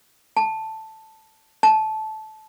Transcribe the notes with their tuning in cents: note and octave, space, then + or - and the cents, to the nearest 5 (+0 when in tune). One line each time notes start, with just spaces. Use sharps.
A5 +5
A5 -15